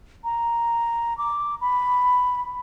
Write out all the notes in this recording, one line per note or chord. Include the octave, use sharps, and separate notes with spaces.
A#5
D6
B5